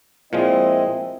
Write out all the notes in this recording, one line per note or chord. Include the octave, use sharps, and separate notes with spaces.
A#2 F3 G#3 C4 E4 D#5